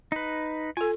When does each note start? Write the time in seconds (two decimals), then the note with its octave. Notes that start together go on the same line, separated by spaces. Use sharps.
0.12 D#4 B4
0.77 F4 A4 G#5